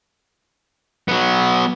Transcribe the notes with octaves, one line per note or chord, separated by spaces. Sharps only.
F#3 B3